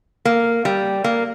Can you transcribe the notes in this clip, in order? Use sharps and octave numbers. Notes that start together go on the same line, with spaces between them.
A#3
G3
A#3